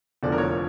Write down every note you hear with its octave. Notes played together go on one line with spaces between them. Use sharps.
F1 E2 D3 F3 D5
A#4
C#5